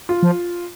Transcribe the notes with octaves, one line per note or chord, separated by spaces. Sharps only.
F4
F3